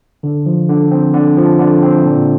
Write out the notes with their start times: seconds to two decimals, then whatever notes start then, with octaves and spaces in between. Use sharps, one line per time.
0.23 D3
0.46 F3
0.69 D3
0.91 C4
1.14 D3
1.37 F3
1.59 D3
1.83 C4
2.05 A#2